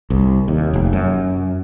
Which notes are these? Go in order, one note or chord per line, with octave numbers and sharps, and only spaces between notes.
C2
D#2
F1
F#2